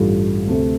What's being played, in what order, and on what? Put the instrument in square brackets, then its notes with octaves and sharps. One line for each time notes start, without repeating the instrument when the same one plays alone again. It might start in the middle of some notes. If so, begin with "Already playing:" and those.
Already playing: [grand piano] A1 G2 G3 F4 A4
D2 C3 A3 C4 A4